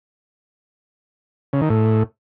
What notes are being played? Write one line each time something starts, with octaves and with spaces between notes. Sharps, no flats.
C#3
D#3
A2